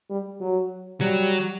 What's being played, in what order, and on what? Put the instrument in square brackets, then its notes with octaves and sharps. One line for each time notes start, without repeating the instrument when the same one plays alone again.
[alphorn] G3
F#3
[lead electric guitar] F#3 [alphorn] G3